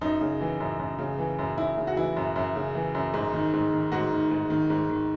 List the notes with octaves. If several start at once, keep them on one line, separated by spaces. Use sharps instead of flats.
F#2 D#4
C#3
E3
F#2
F#2
C#3
E3
F#2
F#2 E4
C#3
F#4
E3 E4
F#2
F#2
C#3
E3
F#2
G#2
D#3
G#2
D#3
G#2 F#4
D#3
G#2
D#3
G#2
D#3